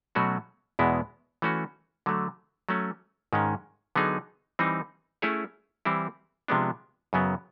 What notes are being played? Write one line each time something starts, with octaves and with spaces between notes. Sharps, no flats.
B2 F#3 A3 C#4 F#4
E2 B2 G#3 B3 E4
E3 A3 C#4 F#4
D3 F#3 A3
F#3 A3 C#4
G#2 D#3 G#3 C#4
D3 F#3 B3 D#4 G#4
E3 G3 C4 D#4
A3 C#4 E4 G#4 C#5
E3 G3 C4 E4
C3 F3 G#3 B3 D4
F#2 C#3 F#3 B3